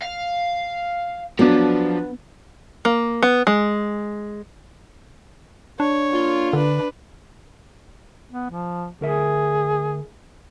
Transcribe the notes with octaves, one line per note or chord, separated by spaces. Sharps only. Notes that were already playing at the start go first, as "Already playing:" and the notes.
F5
F3 F#3 B3 D4
A#3
B3
G#3
D4 C#5
A#3 F4
D3 D4 B4
B3
F3
D2 G#4 A#4 E5